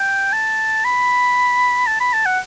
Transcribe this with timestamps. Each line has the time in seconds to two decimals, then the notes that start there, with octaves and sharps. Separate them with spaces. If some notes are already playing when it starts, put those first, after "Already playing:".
Already playing: G5
0.32 A5
0.84 B5
1.87 A5
2.00 B5
2.13 A5
2.26 F#5